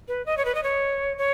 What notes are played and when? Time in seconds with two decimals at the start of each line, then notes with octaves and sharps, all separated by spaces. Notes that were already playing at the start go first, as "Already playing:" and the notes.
0.08 B4
0.26 D#5
0.37 C#5
0.45 B4
0.55 D#5
0.63 C#5
1.18 C#5